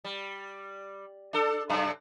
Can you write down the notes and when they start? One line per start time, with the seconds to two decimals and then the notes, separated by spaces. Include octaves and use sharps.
0.04 G3
1.33 D4 A4
1.69 F#2 C3 D4